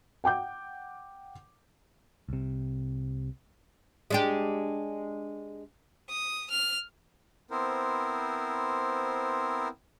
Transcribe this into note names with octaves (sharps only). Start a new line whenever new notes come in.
F#5 G5 D6 G6
C2 C3
G#3 D4 G4
D#6
F6
B3 C4 E4 A#4 C5